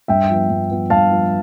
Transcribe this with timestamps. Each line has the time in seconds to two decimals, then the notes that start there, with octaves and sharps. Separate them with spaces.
0.08 G2 E5 G5
0.30 F3 B3
0.50 G2
0.70 F3 B3
0.90 G2 F5 A5
1.11 F3 B3